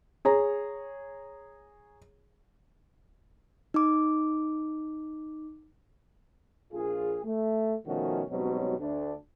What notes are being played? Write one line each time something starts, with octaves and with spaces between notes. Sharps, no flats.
G#4 C#5 A#5
D#4 D6
A#1 F4 G#4
A3
B2 D#3 F3 A3 C#4 F#4
G#2 B2 F#3 G3 C4 C#4
D2 D4